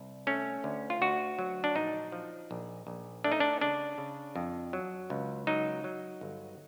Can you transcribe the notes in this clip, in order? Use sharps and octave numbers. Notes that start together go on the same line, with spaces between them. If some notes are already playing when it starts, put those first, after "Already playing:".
Already playing: C2
A3 C#4
D2
F4
D2 F#4
F#3
D4
A#1 D#4
F3
A#1
A#1
A3 D4
D#4
D4
C#3 D4
C#3
F2
F#3
C#2
F#3 D#4
F#3
G1